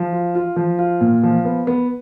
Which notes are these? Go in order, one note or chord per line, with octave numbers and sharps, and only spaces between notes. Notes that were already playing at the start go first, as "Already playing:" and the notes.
Already playing: F3
F4
F4
F3
F4
A#2
F3
B3
B3